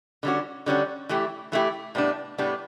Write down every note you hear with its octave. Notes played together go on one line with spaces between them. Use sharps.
D3 G3 C#4 F#4
D3 G3 C#4 F#4
E3 A3 E4 G4
E3 A3 E4 G4
A2 G3 B3 D4
A2 G3 B3 D4